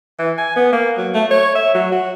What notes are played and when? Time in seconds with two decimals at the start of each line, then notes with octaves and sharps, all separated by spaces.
0.19 E3
0.38 G#5
0.56 B3
0.73 A#3
0.98 F#3
1.14 A3
1.31 C#5
1.55 E5
1.75 F#3
1.92 F#4